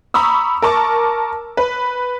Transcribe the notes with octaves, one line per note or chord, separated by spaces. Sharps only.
A#5 B5 C#6 D#6 E6
A#4 A5 C#6 D6
B4